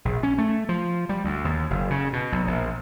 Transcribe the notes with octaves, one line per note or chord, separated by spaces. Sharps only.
A#1
C#4
A3
F3
G3
D2
D#2
F#1
C#3
B2
B1
A#1